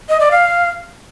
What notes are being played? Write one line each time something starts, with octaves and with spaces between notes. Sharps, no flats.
D#5
D5
F5